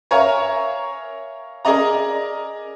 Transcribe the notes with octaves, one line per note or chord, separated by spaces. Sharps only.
A#4 C#5 E5 F5 G#5 A#5
G#4 A#4 D5 D#5 A#5